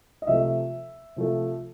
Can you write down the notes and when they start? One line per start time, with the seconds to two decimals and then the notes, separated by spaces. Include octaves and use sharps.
0.22 D#5
0.27 C3 F3 A3 E5
1.16 C3 F3 A3